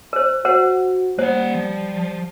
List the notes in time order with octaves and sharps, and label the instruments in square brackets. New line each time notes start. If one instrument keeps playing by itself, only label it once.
[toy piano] A#4 C5
[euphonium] F#4 [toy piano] A#4 C5 F#5
[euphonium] G3 [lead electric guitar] A#3 F#5 [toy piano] C5
[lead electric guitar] F3